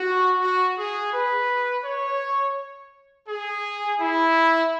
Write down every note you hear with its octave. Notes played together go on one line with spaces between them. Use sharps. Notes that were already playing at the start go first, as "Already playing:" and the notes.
Already playing: F#4
F#4
G#4
B4
C#5
G#4
E4